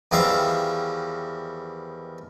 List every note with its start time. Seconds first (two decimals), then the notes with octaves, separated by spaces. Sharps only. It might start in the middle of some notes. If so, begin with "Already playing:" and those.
0.11 E2 D#3 F3 G3 E5 F5